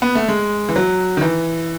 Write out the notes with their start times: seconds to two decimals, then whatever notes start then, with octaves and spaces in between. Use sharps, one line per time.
0.02 B3
0.15 A3
0.28 G#3
0.69 E3
0.76 F#3
1.17 D#3
1.21 E3